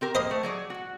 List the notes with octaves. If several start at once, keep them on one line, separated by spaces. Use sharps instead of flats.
C4 G4 A#4
A#3 C5 D#5 B5
A3
F#3 G#4 D5
F#4